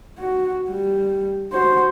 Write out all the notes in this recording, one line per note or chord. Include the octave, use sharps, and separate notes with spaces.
F#4
G3
F#4 C5